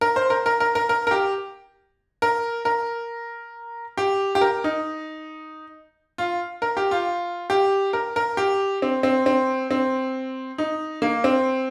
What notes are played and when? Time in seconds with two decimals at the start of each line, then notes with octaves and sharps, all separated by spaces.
0.01 A#4
0.16 C5
0.30 A#4
0.46 A#4
0.60 A#4
0.75 A#4
0.89 A#4
1.07 A#4
1.11 G4
2.22 A#4
2.65 A#4
3.97 G4
4.35 G4
4.41 A#4
4.64 D#4
6.18 F4
6.62 A#4
6.77 G4
6.91 F4
7.50 G4
7.93 A#4
8.16 A#4
8.37 G4
8.82 C4
9.03 C4
9.26 C4
9.71 C4
10.58 D#4
11.02 A#3
11.24 C4